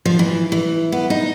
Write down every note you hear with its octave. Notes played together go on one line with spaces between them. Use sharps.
F3
E3
E3
B3
D#4